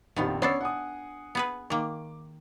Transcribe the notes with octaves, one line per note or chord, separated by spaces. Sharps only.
A#1 F2 D#3 B3 F4 G4
B3 C#4 D4 A4 C#5 C7
F#5 G#5 D#6
B3 G#4 B4
D#3 A#3 D6